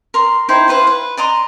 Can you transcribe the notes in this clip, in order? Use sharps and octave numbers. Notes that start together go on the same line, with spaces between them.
A#4 C6
D#4 E4 C5 G5
E4 B4 C5 F5
B4
D5 D#5 A#5 C6